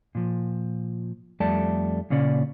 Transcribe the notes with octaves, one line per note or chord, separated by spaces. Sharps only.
A#2 F3
F2 G3 A3 D5 A5
A#2 C#3 A#3 C#4 D5